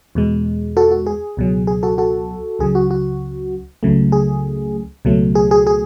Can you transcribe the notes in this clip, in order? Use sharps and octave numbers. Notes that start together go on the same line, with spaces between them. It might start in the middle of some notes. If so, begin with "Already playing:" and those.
E2 B2 G#3
F#4 A4
F#4
G#4
C#2 B2 F#3
G#4
F#4 A4
F#4 A4
C#2 C#3 F#3 G#4
F#4
F#4
C#2 C#3 F#3 A3
G#4
C#2 B2 F#3 A3
G#4
G#4
G#4